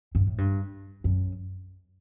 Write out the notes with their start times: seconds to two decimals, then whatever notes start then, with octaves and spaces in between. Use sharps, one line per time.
0.15 G2
0.27 A2
0.38 G2
1.04 F#2